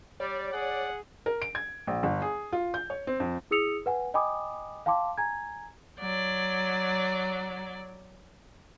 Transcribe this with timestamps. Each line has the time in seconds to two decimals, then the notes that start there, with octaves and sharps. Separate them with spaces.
0.20 G3 C#5 D5
0.53 G#4 F#5
1.26 A#4
1.42 D7
1.55 G#6
1.87 A#1
2.03 G1
2.22 G#4
2.53 F4
2.74 G6
2.90 C#5
3.07 C4
3.20 F2
3.51 E4 G#4 D#6 E6 C#7 F7
3.86 B4 F#5 G#5
4.14 D#5 G5 G#5 B5 D6 D#6
4.86 F5 G5 A5 C6 D6
5.18 G#5 A#5 G#6
6.00 F#3 D5